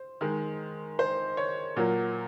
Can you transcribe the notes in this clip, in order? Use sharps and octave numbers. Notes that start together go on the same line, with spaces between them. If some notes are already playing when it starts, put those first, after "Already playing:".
Already playing: C5
D#3 G#3
C5
C#5
A#2 F#3 A#3